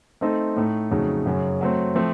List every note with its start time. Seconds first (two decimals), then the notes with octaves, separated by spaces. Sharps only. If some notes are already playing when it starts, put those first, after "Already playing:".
0.21 A3 C4 D#4 A4 D#5
0.56 A2 A3 D#4
0.91 F2 C#3 F#3 A3 D#4
1.26 F#2 C#3 F#3
1.61 F#3 A3 C4
1.95 F3 A3 C4